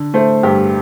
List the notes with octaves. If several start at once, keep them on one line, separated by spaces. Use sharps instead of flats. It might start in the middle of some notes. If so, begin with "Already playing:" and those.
Already playing: D3
A3 C5
G2 G4